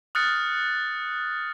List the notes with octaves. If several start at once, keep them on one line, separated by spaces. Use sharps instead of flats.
D#6 F6 F#6 A6 C#7